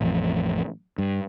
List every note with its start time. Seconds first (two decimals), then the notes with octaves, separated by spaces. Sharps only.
0.01 A1 F2
0.98 G2